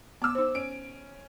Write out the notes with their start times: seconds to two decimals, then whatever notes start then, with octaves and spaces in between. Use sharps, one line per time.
0.22 B3 D6 E6
0.35 D#4 C5
0.55 C#4 D7